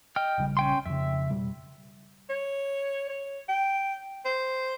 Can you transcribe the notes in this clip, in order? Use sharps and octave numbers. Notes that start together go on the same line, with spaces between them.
D#5 G5 F6
A#1 C#3 G3
C#4 G5 C6
F2 C#3 E5
F1 B2 G3
C#5
C#5
G5
C5